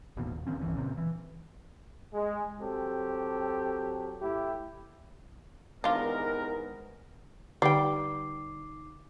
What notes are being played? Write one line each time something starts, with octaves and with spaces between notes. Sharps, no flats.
E1 A1 D#2 B2
D#1
D#2 D#3 C4 C#4
C2 G2 E3 C#4
A#2 C#3 C4
E3
G#3
F#3 C4 G4 A4
A2 E4 G4
E2 C3 D#3 G#3 B3 D4 F4 A#4
D3 G3 D#4 G5 D6 C7